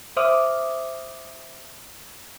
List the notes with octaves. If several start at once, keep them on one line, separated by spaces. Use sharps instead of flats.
C5 E5 D6 D#6 F6